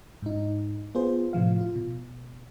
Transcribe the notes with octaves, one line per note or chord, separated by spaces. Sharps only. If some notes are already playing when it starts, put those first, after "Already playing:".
G#2 D#4
B3 F4 G#4 C5
A2 C3 F3 F5
F4
B2